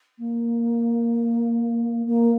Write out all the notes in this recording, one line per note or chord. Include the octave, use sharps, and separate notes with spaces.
A#3
A#3